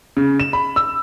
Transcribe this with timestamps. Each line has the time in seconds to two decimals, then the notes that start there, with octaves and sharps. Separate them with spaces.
0.17 C#3
0.40 E7
0.53 B5
0.76 E6